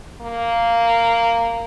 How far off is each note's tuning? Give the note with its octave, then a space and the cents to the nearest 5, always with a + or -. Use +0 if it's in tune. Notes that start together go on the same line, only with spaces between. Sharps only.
A#3 -10